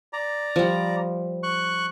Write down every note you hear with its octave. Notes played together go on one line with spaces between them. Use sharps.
D5 A#5
F3 G3
C#6 F#6